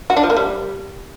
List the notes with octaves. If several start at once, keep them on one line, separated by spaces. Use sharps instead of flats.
F#4
D4
F3
A#3
G3